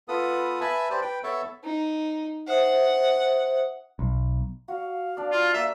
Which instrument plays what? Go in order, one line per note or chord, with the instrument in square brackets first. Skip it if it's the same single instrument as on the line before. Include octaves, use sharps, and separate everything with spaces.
[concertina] B3 F4 A4 B4 D#6
B4 E5 G#5 A5 B5
G4 B4 C5 D5 A5
B4 G5
B3 A4 C#5 E5 A5
[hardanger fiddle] D#4
[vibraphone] C5 E5 D#6 [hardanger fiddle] F#5
[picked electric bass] B1
[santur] F#4 [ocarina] F5
[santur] D4 D5
[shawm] F4
[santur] A#3 [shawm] E5